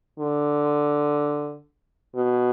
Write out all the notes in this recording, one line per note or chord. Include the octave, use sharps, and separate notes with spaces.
D3
B2